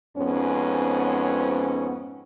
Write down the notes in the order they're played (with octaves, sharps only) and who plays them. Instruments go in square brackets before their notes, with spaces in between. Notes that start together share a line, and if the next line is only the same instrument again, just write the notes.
[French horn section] F2 G#2 B3 C#4